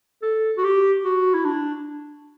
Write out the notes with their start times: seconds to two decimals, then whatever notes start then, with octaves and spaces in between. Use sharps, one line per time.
0.22 A4
0.57 F#4
0.64 G4
1.05 F#4
1.34 E4
1.45 D4